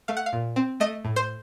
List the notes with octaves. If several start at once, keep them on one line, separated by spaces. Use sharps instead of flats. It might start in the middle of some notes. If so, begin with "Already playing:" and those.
A3 F5
F#5
F5
A#2
C4
A3 D#5
A2
C5